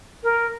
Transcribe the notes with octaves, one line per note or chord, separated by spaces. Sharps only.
A#4